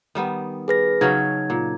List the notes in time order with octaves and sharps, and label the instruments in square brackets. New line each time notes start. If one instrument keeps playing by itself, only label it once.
[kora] D#3 G3 B3
[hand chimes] G#4 B4 A#6
[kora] C#3 F#3 C#4 [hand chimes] D#4 G#6
[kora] A#2